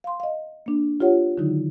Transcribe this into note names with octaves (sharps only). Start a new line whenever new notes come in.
F5 C6
D#5 F5
A#3 D4
F4 G4 C#5 F#5
D3 D#3 F#3 D#4 E4